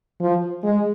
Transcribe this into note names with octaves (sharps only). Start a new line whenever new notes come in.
F3
G#3